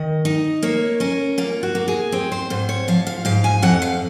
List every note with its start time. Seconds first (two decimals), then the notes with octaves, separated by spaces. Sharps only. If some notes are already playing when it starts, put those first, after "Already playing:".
Already playing: D#3 D#5
0.25 D#4
0.63 A#3 C#5
1.00 C#4 A#4
1.38 A#3 F4
1.63 F#4
1.75 A#3
1.88 G#4
2.12 C4
2.32 C5
2.50 G#2 C5
2.69 C#5
2.88 F3 F5
3.07 F5
3.25 G#2 F5
3.44 G#5
3.62 F2 F#5
3.82 F5